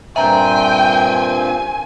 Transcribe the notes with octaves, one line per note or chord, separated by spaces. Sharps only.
G2 A#2 C4 E5 G5 G#5 A#5